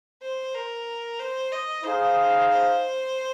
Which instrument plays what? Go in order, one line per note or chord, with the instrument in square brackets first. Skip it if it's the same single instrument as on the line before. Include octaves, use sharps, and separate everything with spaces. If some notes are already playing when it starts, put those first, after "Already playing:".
[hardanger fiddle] C5
A#4
C5
D#5
[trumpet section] D#4 G#4 F5 [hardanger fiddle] C5
[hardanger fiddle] C5